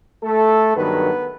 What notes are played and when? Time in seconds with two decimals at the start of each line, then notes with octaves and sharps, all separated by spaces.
0.23 A3 A4
0.74 G2 D#3 F#3 B3 B4